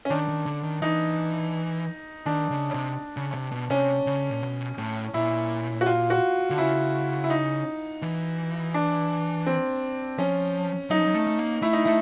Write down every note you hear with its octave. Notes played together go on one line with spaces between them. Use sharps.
C#4
D#3 D4
D#3
D3
D#3
E3 D#4
D#3 D4
C#3
C3
C#3
C3
B2
C3 C#4
C#3
A#2
B2
A2
A#2 E4
F#4
F4
F#4
D3
C#3 E4
E4
D#4
E3
D4
C4
F3 C#4
F#3 D#4
F3
F#3
A3
A3
A#3
A3 E4
D#4
A3 E4